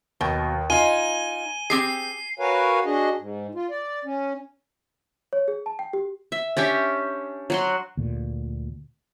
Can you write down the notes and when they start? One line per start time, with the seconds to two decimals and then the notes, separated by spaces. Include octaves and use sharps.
0.21 D#2 B2
0.70 D#4 F4 G#5 D#7 G7
1.70 C4 G4 G#4 C7
2.39 F#4 A#4 B4 C#5 F5 G#5
2.86 D4 F#4 G#4 D#5
3.18 G#2
3.55 F4
3.70 D5
4.05 C#4
5.33 C#5
5.48 G#4
5.66 A5
5.79 G5
5.93 G4
6.32 E5
6.57 C#4 D4 G4 E5
7.50 F#3 F#4 C6
7.97 D2 A#2